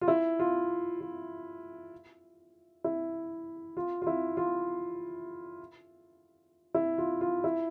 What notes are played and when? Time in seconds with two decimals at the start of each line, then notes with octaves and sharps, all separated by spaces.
0.01 F4
0.08 E4
0.39 F4
1.00 F4
2.84 E4
3.77 F4
4.02 F4
4.07 E4
4.37 F4
6.74 E4
6.98 F4
7.21 F4
7.44 E4